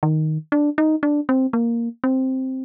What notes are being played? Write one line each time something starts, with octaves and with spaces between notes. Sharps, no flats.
D#3
D4
D#4
D4
C4
A#3
C4